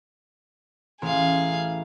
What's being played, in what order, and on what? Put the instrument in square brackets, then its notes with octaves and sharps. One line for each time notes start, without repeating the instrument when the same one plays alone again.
[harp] A1 [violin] G#4 F5